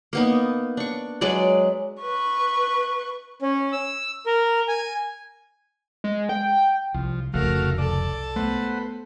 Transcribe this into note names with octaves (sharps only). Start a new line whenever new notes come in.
A#3 B3 D#4
D4 C#6
F#3 G#3 B4 D5
B4 C#6
C#4
E6
A#4
G#5
G#3
G5
C2 F3
F1 C2 C#3 F3 A3 F#4 A#4 F5
A4 D5
A3 B3 B4 C5 F#5